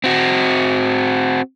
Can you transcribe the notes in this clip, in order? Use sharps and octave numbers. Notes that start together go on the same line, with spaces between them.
C4 F#4